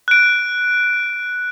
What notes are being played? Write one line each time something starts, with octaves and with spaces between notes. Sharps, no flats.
F#6 D7